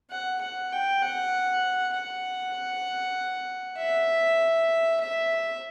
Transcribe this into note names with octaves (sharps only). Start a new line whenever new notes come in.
F#5
F#5
G5
F#5
F#5
E5
E5